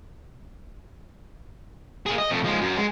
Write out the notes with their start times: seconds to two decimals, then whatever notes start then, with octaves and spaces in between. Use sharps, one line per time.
2.06 A#3 G#4
2.18 D#5
2.31 F2 A3
2.44 F3 G#3
2.61 F#2
2.77 G#3